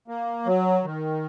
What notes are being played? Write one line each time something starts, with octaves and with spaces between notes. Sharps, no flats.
A#3
F#3
D#3